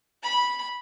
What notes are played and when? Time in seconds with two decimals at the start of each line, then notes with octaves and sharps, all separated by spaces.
0.23 B5